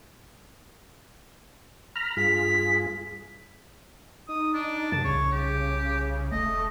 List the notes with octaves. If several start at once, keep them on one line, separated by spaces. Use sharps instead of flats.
A#5 B5 F6
G2 F4 G#4 B6
D#4 D#6
D4
F#2 C3 A5
C2 C#3 C#5
G4
E1 A3 D#5